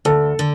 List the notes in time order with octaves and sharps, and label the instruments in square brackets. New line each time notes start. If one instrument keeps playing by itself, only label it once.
[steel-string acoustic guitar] D2 [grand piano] A4
[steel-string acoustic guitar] D3